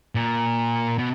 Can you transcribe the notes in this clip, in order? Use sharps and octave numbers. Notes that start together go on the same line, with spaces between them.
A#2
B2